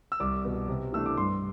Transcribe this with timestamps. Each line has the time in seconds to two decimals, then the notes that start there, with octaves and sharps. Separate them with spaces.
0.12 E6
0.20 C2 D6
0.44 B2 B3
0.68 C3
0.92 E3 A3 D4 E6
1.06 D6
1.17 G2 C6